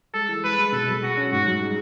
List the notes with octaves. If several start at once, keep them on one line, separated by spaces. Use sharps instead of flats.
G#3 A4
E3
G#3 B4
G#3
B2 A4
F#3
F#4 G#4
C#4
G#2 F#4
F#3
G#3